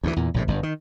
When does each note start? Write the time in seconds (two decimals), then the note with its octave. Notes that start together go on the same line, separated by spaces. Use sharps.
0.03 D2 A2 E3
0.16 E2 A#2
0.34 A#1 A2 C3
0.48 G1 G2
0.63 D#3